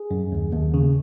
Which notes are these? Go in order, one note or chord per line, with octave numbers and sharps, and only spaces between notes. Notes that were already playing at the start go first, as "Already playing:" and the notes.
Already playing: G#4
F#2
D#2
D#2
C#3